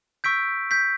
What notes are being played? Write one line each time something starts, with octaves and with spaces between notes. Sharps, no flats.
C#6 E6 G6 B6 D7
G6 B6